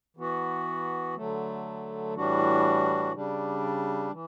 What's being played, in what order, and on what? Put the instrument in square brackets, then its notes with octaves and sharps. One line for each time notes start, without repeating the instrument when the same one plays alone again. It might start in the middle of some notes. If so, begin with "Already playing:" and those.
[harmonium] E3 B3 F#4
D3 F#3 A3
A2 E3 G3 D4 F#4
C#3 G3 D4
E3